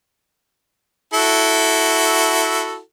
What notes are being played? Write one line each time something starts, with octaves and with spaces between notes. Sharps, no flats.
E4 F#4 A4